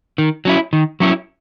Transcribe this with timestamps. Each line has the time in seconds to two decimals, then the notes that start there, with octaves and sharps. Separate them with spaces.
0.18 D#3
0.45 F#3 C#4 E4
0.73 D#3
1.00 F#3 C#4 E4